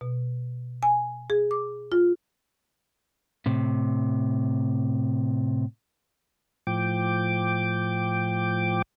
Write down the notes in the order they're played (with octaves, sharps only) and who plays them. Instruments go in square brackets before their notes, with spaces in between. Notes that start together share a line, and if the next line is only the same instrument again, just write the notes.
[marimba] B2
G#5
G#4
D6
F4
[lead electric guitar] A2 C3
[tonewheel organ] A2 F3 G5 D6